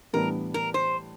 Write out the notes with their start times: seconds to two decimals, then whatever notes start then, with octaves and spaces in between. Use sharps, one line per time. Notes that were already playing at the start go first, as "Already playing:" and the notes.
0.13 A2 E3 G3 B3 D4 A#4
0.54 A#4
0.74 C5